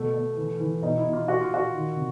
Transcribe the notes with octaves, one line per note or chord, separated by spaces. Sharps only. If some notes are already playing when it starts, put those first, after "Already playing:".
Already playing: B2 A3
B2
E3
E3
B2 D#4
E4
B2
F4
A#2 F#4
F4
A#2 F#4
D#3
C3